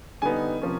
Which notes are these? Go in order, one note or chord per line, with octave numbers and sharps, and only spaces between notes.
D3 G3 B3 D#4 G#5
C3 F3 A#3 C#4